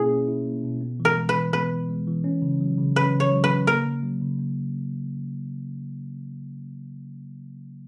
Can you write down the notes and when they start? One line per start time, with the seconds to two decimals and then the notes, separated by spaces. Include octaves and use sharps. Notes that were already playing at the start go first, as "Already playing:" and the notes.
Already playing: B2 A#3 C#4 E4 G#4
0.10 C#4
0.28 E4
0.46 A#3
0.64 B2
0.81 B3
1.00 E3
1.05 A#4
1.17 G#3
1.29 B4
1.35 E3
1.53 B3 B4
1.71 E3
1.89 G#3
2.07 E3
2.24 C#4
2.42 C#3
2.61 F#3
2.78 C#3
2.96 C#4 B4
3.15 C#3
3.20 C#5
3.32 F#3
3.44 B4
3.49 C#3
3.67 A#3 A#4
3.85 C#3
4.03 F#3
4.22 C#3
4.39 A#3